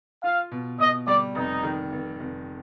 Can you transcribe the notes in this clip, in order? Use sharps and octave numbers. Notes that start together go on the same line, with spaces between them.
F4 F5
B2
B2 D#5
G3 D5
F1 D#4
D#3
F1
F1